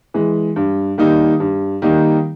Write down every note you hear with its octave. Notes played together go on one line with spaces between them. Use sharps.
E3 G#3
G2
D#3 G3 A#3 D#4
G2
D#3 G3 A#3 D#4